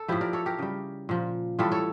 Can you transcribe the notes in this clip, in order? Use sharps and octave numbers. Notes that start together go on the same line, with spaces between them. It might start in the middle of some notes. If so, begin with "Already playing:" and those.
Already playing: A4
A2 F3 E4 G4
A#4 D5
A4 C#5
G4 A#4
C#3 G3
A#2 F3
A2 E3 G3 F4 A4
A4 C#5